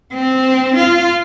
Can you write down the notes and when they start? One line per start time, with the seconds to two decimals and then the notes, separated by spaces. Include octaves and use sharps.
0.14 C4
0.76 F4